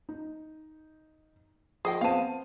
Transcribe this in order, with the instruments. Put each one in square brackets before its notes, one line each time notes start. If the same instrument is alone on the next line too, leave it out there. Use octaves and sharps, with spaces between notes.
[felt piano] D#4
[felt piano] F3 [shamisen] G#4 D#5 G5
[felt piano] B3 C4 D#7 [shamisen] F5 A5